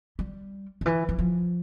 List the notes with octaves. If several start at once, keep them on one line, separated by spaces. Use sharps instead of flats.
G3
D3
E3
E3
F3